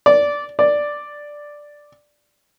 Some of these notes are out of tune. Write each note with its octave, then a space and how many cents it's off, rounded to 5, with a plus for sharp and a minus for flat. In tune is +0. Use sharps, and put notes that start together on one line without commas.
D5 -15
D5 +0